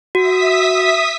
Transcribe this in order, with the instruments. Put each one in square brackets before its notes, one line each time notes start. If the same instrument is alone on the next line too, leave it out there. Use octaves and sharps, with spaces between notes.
[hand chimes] F#4 [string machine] E5 D#6 B6